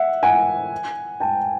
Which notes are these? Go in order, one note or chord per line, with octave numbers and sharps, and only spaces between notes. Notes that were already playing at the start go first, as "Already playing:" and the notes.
Already playing: E5 F#5
F#5 G#5
G5 A5